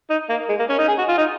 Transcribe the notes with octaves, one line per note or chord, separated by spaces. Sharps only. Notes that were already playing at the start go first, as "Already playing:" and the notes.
D#4
A#3
G#3
A#3
C#4
D#4
G#4
F#4
F4
D#4